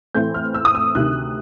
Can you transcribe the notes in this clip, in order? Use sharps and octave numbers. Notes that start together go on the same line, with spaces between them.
A2 E3 A3 C4 G6
F6
E6
D#6
E6
D2 C3 D#3 F#6